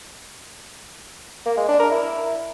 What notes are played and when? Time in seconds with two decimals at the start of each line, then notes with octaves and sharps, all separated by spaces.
1.46 A#3
1.57 G#3
1.68 D4
1.80 A#4
1.91 E4